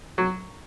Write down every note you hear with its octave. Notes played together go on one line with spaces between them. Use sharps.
F#3